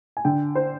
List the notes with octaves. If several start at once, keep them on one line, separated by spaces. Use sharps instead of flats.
G#5
D3 G5
C5